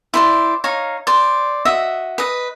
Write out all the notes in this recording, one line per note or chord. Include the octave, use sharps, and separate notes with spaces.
E4 C5 D5
D#4 C#5 F5 A#5
C5 D5
F#4 D#5 E5
B4 D#5